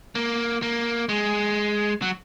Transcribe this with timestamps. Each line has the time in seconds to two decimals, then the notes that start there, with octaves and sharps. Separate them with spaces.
0.15 A#3
0.62 A#3
1.09 G#3
2.02 F#3